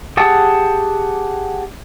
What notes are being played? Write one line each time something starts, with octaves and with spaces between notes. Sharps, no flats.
G4 G#4 F#5 A5 E6